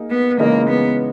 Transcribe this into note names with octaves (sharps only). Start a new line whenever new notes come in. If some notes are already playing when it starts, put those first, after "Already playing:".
Already playing: A#3 D#4 G#4
B3
C#3 E3 G#3 A#3 D#4 A#4
B3